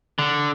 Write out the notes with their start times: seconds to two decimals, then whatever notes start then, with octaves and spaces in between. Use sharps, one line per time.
0.19 D3